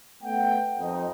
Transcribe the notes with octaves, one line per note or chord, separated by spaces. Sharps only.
A3 B3 F#5 G5
F2 D#4